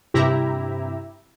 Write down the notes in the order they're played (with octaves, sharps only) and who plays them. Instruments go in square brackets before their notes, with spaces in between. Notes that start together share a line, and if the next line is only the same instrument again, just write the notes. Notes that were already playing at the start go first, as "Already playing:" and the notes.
[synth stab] G2 C3 E4 G4 E5 A#5